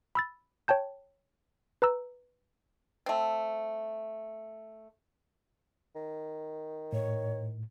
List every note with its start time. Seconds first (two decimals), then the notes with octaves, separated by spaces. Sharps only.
0.15 B5 E6 A6
0.68 C#5 G5 A5 G6
1.82 B4 A#5 E6
3.06 A3 C4
5.95 D#3
6.93 A2 C#5